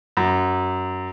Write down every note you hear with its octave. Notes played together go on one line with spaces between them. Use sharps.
F#2